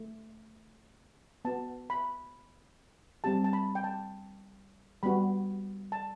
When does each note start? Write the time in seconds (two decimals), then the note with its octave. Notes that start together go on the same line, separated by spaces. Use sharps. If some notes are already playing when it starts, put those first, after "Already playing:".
Already playing: A3
1.45 B3 F#4 A5
1.90 B5
3.24 G3 C4 G4 A5
3.44 A5
3.53 B5
3.75 G5
3.84 A5
5.03 G3 B3 F#4 B5
5.92 A5